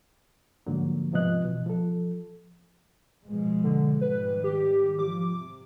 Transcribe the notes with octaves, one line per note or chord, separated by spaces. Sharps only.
G#2 D3 F3 F#3 A#3
G#2 C3 F3 B3 D#5 F#6
B2 E3
F3 A4
B2 F3 G#3
D3
G#2 D#3 G3 B4
G4
F3 D6
C3